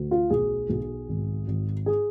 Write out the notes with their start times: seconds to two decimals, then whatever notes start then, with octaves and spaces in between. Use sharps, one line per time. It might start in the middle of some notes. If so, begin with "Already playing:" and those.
Already playing: D2
0.11 F4
0.30 B1 G#4
0.69 B1
1.08 G#1
1.47 G#1
1.86 G#4